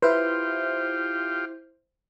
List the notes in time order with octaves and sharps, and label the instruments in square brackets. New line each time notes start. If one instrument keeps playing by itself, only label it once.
[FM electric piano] E4 C5 [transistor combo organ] F4 G4 [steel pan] B4